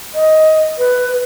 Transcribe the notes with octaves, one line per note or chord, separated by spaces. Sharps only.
D#5
B4